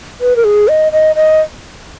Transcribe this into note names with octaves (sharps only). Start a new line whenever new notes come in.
B4
A#4
G#4
D#5
D#5
D#5